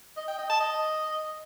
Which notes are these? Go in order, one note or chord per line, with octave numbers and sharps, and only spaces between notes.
D#5
G5
D#5
A5
D#5